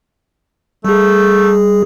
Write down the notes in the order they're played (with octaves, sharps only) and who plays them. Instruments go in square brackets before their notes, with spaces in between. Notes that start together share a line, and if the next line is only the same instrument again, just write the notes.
[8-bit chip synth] G3 G#4 [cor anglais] A3